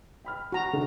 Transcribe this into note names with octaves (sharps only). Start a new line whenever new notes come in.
G5 B5 F6
F#4 A#5
C#3 A3 D4